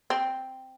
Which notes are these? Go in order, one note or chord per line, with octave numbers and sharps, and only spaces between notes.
C4